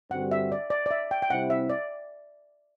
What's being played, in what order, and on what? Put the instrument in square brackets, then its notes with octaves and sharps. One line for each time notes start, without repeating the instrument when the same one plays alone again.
[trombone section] G2 D3 G3 C4 F#4 [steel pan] F#5
[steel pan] E5
D5
D5
D5
E5
G5
G5
[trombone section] C3 G3 C4 E4 [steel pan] F#5
[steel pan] E5
D5